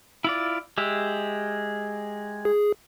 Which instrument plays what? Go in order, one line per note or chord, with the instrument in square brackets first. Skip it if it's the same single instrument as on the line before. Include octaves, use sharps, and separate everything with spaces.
[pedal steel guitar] E4 F4 D5
G#3 G4 E5
[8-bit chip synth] G#4